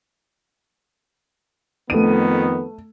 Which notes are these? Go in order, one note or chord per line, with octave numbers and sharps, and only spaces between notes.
F2 D#3 A3 B3 D#7